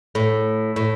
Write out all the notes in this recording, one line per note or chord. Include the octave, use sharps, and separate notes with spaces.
A2
A2